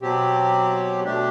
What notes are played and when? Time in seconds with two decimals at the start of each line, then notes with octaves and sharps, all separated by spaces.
0.01 B2 F#3 C4 G4
1.04 B2 A3 D4 G4